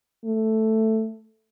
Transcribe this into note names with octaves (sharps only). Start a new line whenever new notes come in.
A3